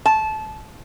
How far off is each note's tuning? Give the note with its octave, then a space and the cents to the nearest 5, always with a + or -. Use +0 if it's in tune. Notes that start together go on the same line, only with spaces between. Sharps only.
A5 -20